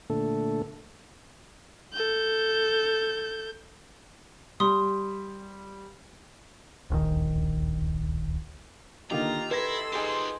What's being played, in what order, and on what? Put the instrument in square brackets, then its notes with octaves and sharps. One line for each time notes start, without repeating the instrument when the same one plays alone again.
[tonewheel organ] A#2 D3 A3 A4
[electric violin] A4 G6
[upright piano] G3 [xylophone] C6 D#6
[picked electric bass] D1 A#1 D#2 D#3
[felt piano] D3 D#3 A#3 [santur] D#4 G4 [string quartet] F4 [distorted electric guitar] A#5
[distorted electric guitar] E4 [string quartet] A4 C6 E6 [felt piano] B4 G#6 A#6
[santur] D#4 G#4 C5 [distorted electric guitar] F4 G4